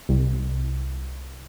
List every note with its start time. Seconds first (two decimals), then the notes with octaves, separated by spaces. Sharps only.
0.09 C2